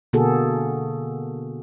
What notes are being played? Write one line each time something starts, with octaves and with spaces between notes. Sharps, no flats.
B2 D3 A#3 F#4 G#4 A4